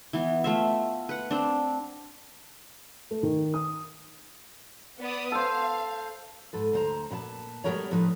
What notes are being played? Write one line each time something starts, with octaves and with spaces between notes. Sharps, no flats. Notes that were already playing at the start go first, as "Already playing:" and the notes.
E3 B3
A3 F4 E5
B4 F#5
C4 D4
A3
D#3
D#6
B3 D5 D#6
A4 C5 F5
G#2 A4 B4
D2 C5 A#5
A#2 B4 F5 A5
G3 A3 B3 A#4 B4 C#5
A2 F3 D#4 B4